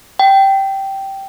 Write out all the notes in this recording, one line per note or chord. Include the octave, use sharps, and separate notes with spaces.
G5